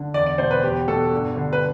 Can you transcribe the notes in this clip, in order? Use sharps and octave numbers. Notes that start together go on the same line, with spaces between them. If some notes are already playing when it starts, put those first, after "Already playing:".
Already playing: D3
E2 D5
D5
B2 C5
B4
E2 G4
B2 A4
G2
D3
B4